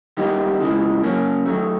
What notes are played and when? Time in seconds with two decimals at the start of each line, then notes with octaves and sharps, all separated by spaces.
0.17 D#3 G3 B3 D#4
0.60 C#3 E3 G#3
1.03 C#3 F#3 A#3 C#4
1.46 D#3 F#3 A3